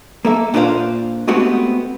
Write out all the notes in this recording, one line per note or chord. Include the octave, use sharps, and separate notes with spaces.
A#3 A4 E5
A#2 D4 D#4 A4 C5 F5
G#3 A3 B3 C4 F#4 G4